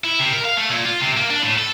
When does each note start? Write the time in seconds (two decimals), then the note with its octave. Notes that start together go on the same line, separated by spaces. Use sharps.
0.04 E4
0.19 C3
0.33 A#4
0.44 F5
0.57 A3
0.70 A#2
0.86 F4
1.01 C3
1.17 A#3
1.30 D4
1.42 A2
1.58 A4